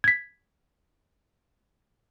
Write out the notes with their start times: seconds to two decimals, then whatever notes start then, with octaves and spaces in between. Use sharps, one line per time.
0.04 G#6 B6